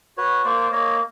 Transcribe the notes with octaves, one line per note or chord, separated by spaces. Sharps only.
F#4 B4 C#5
A#3 C5 D5
A#3 C#5 D#5